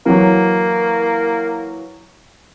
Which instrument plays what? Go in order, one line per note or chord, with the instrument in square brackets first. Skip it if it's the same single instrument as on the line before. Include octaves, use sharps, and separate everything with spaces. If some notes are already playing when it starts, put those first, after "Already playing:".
[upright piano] E3 F#3 [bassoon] A#3